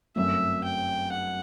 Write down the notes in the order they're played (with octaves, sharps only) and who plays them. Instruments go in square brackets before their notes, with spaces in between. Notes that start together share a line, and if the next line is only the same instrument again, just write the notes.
[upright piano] G1 F#2 F#3 A3 C4 [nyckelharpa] E5
[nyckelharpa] G5
F#5